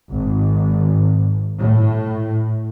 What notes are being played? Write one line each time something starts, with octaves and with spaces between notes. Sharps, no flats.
G#1
A2